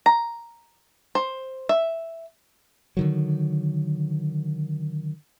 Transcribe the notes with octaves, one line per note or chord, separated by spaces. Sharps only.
A#5
C5
E5
D3 D#3 F#3